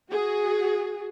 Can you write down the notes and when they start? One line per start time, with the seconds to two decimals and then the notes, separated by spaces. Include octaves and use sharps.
0.10 F#4 G#4